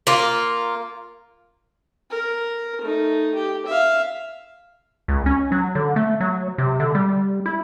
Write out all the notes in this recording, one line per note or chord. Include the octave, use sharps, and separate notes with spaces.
A#3 F4
A#4
A3 D#4
G4
E5 F5
C#2
C#4
F#3
D3
A3
F#3
C3
D3
G3
E4